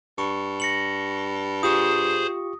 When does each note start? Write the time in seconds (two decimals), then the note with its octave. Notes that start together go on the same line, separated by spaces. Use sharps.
0.18 G2 C#6
0.60 A#6 C#7 F#7
1.63 F4 G4 G#4 C5 C#6 D#6